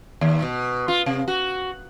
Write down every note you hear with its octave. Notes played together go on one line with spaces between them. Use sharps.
D#2
B2
F4
C3
F#4